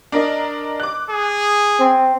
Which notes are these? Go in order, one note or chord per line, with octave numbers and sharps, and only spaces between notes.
D4 A#4 D#5
D6 F#6
G#4
C4